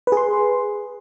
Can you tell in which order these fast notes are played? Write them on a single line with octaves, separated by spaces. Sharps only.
B4 G#4 C6